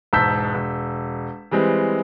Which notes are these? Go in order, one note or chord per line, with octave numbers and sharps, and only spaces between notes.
E1 G#2 A5 E6 G6 B6
E1
E3 G3 G#3 C4